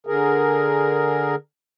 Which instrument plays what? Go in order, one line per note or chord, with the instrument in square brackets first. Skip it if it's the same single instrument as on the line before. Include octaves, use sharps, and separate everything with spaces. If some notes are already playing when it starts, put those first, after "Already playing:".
[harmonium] D3 G#4 A#4